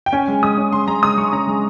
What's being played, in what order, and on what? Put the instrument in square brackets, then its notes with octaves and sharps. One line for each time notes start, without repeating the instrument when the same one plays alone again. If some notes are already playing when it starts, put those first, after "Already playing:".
[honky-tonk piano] G5
C#4 G#5
G#3
G#3 D#6
C#4
G#3 C6
G#3 A#5
G#3 D#6
G#3 C#6
C#4 A#5
G#3